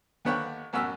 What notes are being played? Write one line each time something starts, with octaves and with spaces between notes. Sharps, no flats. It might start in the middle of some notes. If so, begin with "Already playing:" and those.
D#2 D3 B3 C#5 F#5 G5
A1 F#2 F#4 E6